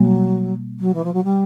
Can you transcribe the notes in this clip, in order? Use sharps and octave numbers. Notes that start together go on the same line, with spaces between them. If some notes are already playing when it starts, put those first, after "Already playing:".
Already playing: B2 F#3 G3 A#3
F#3
E3
F3
F#3
G3